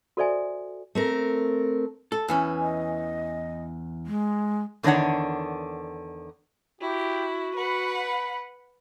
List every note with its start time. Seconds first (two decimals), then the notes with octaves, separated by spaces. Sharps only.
0.17 F#4 A4 C5 D5 E5 G#5
0.95 A3 C4 A#4
2.12 A4
2.28 E2 E3 C#4
2.60 D#5
4.06 G#3
4.83 E2 D3 D#3 D4 C#5 F#5
6.81 E4 F#4 G4
7.54 B4 F#5 B5